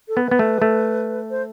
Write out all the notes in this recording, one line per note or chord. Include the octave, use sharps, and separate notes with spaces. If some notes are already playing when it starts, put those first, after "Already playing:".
A4
B3
B4
B3
A3
A3
C5